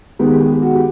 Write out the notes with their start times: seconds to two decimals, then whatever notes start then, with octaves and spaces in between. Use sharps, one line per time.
0.19 D#3 G#3 B3 G4
0.30 G4
0.41 G#4
0.52 G4
0.62 F#4
0.75 G4